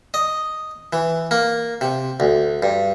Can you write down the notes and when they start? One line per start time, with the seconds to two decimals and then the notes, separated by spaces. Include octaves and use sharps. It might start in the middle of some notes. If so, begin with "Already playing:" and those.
0.14 D#5
0.93 E3
1.31 A#3
1.81 C3
2.20 D2
2.63 G2